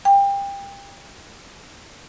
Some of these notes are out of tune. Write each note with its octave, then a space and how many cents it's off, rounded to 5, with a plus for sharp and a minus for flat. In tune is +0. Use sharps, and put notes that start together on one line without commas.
G5 +25